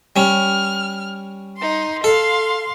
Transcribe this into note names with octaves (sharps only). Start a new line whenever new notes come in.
G3 C#4 F6
D#4 C6
A4 F5 C6